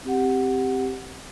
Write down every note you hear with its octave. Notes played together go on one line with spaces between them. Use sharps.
C4 G4 F#5